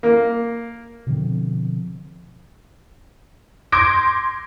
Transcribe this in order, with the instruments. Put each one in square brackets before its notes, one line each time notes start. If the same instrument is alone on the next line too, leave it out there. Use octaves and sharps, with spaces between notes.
[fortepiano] A#3
[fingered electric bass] B2 D3 F3 C4
[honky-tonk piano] C6 D6 G6 G#6 A#6 D7